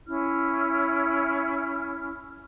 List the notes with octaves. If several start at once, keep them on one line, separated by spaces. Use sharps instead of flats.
C#4 E4 F6